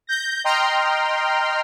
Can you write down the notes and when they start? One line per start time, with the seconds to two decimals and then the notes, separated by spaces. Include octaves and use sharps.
0.07 G6 A#6
0.44 D#5 G5 A#5 C6 F6